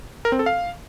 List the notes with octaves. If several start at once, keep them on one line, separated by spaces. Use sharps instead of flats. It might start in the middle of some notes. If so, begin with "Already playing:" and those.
A#4
C4
A4
F5